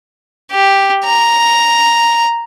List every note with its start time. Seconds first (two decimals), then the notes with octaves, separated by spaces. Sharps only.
0.51 G4
1.05 A#5